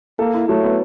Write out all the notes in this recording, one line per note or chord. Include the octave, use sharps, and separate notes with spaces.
A#3 A4
E4
F#3 A3
B3